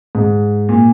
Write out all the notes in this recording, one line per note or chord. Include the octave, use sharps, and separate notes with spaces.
G#2
A#2